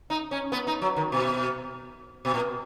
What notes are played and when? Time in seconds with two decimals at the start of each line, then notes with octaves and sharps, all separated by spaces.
0.10 D#4
0.31 C#4
0.52 B3
0.67 D#4
0.82 F#3
0.96 D#3
1.12 B2
2.25 B2
2.34 A#2